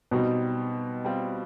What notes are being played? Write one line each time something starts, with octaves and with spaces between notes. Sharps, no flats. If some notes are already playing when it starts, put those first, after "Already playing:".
B2 G3 C4 D#4
G3 C4 F4